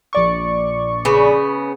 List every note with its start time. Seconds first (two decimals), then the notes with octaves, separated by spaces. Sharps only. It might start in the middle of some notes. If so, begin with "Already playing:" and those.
0.13 A#1 D5 C#6
1.05 C#3 B3